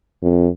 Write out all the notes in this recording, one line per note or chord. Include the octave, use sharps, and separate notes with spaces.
F2